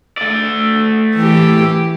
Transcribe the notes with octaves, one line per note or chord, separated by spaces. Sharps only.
A3 D5
E3 G4